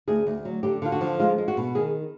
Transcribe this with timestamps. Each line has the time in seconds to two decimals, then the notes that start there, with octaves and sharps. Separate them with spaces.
0.08 D2 G#4
0.27 D2
0.45 F#3
0.63 D3 G4
0.82 D3 F4
0.92 F#4
1.01 F3
1.19 G#3 F4
1.38 G#3
1.48 F#4
1.57 B2
1.75 D#3 G#4